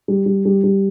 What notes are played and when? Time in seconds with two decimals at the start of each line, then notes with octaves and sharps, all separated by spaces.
0.08 G3
0.26 G3
0.45 G3
0.64 G3